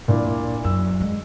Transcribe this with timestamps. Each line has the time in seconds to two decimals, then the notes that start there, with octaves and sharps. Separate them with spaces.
0.08 A#2 D4 E4
0.21 D1
0.64 F#2 E6
1.00 G#3